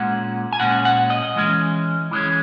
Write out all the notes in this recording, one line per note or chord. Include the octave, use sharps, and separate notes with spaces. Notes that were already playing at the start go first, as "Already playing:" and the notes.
Already playing: A#2 G#3 C#4 F#5
G#5
A#2 G#3 C#4 F#5
F#5
D#5
E3 G#3 C#4
E3 G#3 C#4